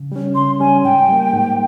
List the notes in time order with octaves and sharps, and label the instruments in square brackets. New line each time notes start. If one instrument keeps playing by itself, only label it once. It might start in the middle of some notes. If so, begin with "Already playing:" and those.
Already playing: [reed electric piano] C#3
G3 C#4
[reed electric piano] C#3 [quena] C6
[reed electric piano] G3 C#4 [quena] G#5
[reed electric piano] G#2 [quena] G5
[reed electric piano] G3 A#3
G#2